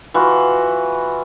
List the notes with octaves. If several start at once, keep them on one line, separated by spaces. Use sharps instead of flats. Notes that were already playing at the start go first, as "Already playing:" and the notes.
E3 F4 F#4